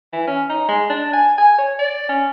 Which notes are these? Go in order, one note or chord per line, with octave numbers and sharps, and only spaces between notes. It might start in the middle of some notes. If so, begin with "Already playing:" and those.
E3
C#4
D#4
G#3
D4
G#5
G#5
C#5
D5
C#4